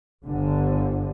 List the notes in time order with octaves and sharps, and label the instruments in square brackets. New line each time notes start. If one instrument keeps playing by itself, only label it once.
[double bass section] G1 D3